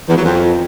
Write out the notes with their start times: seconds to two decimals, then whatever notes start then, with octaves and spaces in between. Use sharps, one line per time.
0.09 E2
0.17 F#3
0.25 F2